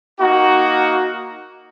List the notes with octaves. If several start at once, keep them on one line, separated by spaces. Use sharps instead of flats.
A#3 D#4 F#4